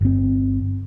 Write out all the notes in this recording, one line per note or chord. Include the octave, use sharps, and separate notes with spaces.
G1 C4